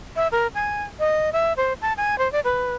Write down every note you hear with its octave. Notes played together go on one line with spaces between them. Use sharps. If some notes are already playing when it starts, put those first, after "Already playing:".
E5
A#4
G#5
D#5
E5
C5
A5
G#5
C5
D5
B4